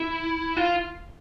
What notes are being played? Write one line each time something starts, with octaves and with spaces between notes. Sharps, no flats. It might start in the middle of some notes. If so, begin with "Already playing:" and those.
Already playing: E4
F4